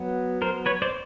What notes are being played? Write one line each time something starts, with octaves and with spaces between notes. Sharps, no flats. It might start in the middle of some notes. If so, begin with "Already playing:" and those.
Already playing: F#3 B3
A#4 C5
B4 C#5
C5 D5